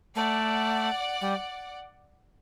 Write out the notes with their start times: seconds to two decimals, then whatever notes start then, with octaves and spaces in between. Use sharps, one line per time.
0.15 A3 D5 F#5
1.21 G3